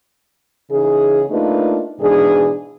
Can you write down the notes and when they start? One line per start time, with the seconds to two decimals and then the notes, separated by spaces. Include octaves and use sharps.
0.70 C#3 E3 D#4 G#4
1.30 A3 A#3 D4 D#4 F4 B4
2.00 G#2 B2 E3 D4 G#4